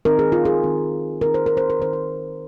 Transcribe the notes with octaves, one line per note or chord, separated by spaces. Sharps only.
D#3 C4 D#4 A#4
G#4
F4
G#4
D#3 C4 D#4
D#3 C4 D#4 A#4
C5
A#4
C5
A#4
D#3 C4 D#4 C5
A#4